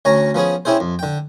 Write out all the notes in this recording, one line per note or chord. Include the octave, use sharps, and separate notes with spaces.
D2 C#4 C#5 A#5
F3 B3 C#4 G#4
C4 C#4 E4 G#4 C5
F2
D3 G5